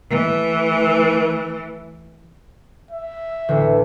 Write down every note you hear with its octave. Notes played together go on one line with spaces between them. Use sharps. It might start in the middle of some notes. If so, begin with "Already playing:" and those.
E3 A3
E5
A1 D2